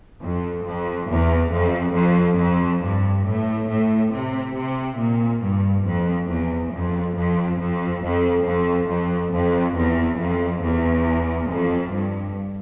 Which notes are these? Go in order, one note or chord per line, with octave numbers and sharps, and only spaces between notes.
F2
F2
E2
F2
F2
F2
G2
A2
A2
C3
C3
A#2
G2
F2
E2
F2
F2
F2
F2
F2
F2
F2
E2
F2
E2
F2
G2